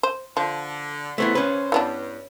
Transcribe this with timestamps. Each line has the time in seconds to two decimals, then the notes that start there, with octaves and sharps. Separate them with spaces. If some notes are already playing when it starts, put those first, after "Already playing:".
0.03 C5
0.37 D3 F3
1.18 C#3 A3 B3 E4 C5
1.35 C#4 B4
1.72 G2 E3 B3 D4